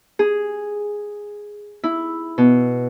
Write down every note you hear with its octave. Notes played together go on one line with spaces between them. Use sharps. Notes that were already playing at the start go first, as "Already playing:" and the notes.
G#4
E4
B2